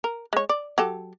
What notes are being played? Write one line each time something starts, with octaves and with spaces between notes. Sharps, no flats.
A#4
G#3 C#5
D5
F#3 G4 A4